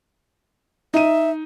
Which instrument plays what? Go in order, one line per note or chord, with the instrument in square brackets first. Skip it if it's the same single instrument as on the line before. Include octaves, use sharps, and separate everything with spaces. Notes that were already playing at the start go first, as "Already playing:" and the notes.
[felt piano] D#4 D#7 [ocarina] E5